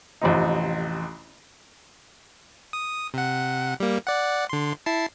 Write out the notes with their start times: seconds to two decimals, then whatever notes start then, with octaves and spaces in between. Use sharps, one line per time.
0.22 A1 F2 C3 D#4
2.73 D#6
3.14 C3 F#5
3.80 G3 A#3
4.07 D5 F#5
4.50 D3 C6
4.86 E4 A5 C7